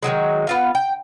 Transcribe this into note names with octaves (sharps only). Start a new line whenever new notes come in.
D#3 E3 F#3 G#3
B3 F4 F5
G5